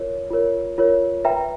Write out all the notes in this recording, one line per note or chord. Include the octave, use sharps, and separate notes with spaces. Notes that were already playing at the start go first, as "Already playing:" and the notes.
Already playing: F4 A#4 C#5
F4 A#4 C#5
F4 A#4 C#5
B4 E5 G5 A#5